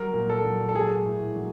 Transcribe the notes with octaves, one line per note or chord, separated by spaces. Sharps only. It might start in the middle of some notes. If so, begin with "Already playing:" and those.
Already playing: F#3 G3 A#4
A#2
A4
F#3
A4
F#3 G#4
A2
F#3